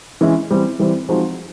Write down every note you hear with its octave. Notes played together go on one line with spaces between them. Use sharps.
E3 G#3 C#4 E4
E3 G3 C4
E3 G3 C4
F3 G#3 C4 D#4 F#4